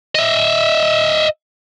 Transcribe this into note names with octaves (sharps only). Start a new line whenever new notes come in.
D#5 E5